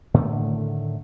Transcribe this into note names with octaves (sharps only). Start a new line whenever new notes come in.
A2 D3 D#3 A3